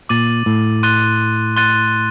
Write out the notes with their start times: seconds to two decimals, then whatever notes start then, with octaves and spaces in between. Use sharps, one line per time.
0.09 A#2 D6 A6 D#7 F#7
0.46 A2
0.83 C6 F#6 A6 D#7 G7
1.56 C6 F#6 A6 D#7 G7